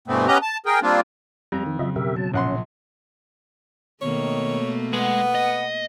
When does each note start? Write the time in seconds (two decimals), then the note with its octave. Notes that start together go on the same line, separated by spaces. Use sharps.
0.08 G2 B2 E3 A3 B3 C4
0.27 B3 C#4 G4 B4 D#5 A#5
0.42 A5
0.66 G#4 A#4 G5
0.82 G3 A#3 C4 D4 F4
1.52 F2 G3 A#5
1.66 D#3
1.79 C#3 F#3 F4 D#5 E5
1.96 B2 G4 A#4 E5
2.16 F#3 A5
2.33 A#1 C#4 F#5 C6
4.01 B2 D#3 A3 A#3 C#5
4.93 G#3 B3 F#5
5.35 D#5